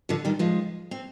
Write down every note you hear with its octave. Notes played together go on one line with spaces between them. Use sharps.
D3 F3
D#3 G3
F3 G#3
C4